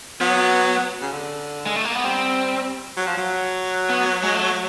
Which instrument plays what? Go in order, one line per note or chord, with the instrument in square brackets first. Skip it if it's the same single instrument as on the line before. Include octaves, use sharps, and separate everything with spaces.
[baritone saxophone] F#3 [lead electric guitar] B3
[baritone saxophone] C#3
D3
[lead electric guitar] G#3
A3
A#3
B3
[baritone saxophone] G3 [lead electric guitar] C4
[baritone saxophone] F#3
F3
F#3
[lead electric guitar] B3
G#3
A3